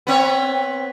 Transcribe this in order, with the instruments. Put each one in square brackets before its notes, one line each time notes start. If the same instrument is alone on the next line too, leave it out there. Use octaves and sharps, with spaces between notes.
[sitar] B3 C4 C#5